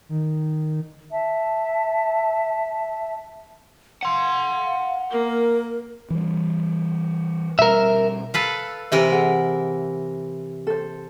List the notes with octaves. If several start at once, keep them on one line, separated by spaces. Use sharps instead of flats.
D#3
E5 A5
F5 F#5 C6
A#3 A#4
E3 G3
B2 G3 A#4 E5
A4 B4 F5
C3 E3 A#4 C5 C#5 E5
G#4 F#5
A4 C5